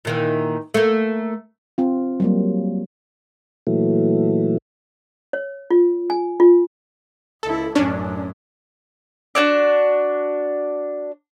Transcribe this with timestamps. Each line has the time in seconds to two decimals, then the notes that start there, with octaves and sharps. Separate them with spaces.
0.05 A#2 D#3 E3
0.74 A3 A#3
1.78 C4 F4
2.20 F#3 G3 A#3
3.67 A#2 E3 F#3 A3
5.33 C#5
5.71 F4
6.10 G#5
6.40 F4
7.43 C#2 E4 A4
7.75 A1 F#2 C#4 D4
9.35 D4 F#4 C#5 D5